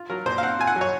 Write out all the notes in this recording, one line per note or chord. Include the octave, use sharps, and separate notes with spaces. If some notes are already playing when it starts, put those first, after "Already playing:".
Already playing: F4
F#3 A#4
A#2 C5
F5
C4 F#5
F4 G#5
F#5
F#3
C#5